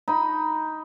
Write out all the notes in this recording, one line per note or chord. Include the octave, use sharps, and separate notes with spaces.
D#4 B5